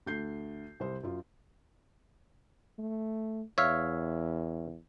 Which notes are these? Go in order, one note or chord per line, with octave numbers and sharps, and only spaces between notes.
D2 G6 C7
C2 C5
F#2 F4
A3
E2 C#5 E5 F5